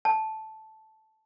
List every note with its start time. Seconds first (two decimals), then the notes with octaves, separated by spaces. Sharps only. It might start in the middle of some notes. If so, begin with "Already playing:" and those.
0.05 A5